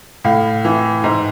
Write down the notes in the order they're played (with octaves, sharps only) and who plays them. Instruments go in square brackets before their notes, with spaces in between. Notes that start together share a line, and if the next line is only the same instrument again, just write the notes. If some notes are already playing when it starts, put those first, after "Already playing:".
[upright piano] A2 F5
E3
G#2